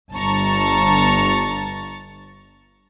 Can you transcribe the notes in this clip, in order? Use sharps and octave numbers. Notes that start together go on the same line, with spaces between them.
G1 A5 A#5 C#6 A6